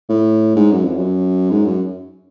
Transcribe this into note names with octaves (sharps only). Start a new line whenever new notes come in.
A2
G#2
F#2
F2
F#2
G#2
F#2